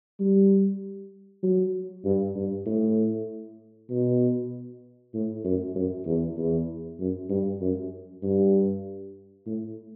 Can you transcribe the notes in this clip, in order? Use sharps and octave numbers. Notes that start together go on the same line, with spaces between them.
G3
F#3
G2
G2
A2
B2
A2
F#2
F#2
E2
E2
F#2
G2
F#2
G2
A2